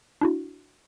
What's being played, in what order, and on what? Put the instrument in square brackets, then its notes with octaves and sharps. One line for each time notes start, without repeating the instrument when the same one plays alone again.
[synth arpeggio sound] D4 E4 F#4